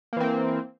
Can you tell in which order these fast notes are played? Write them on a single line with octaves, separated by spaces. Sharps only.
A#3 E3 C4